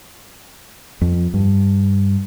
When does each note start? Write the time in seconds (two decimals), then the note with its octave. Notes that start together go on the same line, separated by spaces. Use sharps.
1.01 F2
1.34 G2